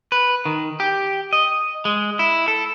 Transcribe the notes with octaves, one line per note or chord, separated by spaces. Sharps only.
B4
D#3
G4
D#5
G#3
E4
A4